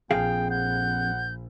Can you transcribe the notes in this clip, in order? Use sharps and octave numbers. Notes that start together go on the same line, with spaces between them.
A#1 F2 G#4 F5 G5
F#5 G6